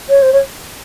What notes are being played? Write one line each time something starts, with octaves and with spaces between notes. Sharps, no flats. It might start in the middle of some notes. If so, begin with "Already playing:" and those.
C#5
C5
C#5